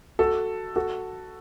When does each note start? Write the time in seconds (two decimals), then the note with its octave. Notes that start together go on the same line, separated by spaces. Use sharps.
0.19 F#4 A4
0.76 F#4 A4